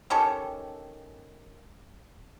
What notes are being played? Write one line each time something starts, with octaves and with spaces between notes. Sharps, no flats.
D#3 C#4 G4 A4